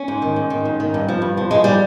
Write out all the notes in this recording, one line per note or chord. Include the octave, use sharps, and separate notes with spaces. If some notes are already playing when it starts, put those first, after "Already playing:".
Already playing: C#4
G#2
D#3
G#2
D#3
G#2
D#3
G2
F3
G2
F3
G2 G#3
F3 G3